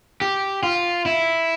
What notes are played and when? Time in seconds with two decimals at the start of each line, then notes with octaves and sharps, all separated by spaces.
0.21 G4
0.63 F4
1.06 E4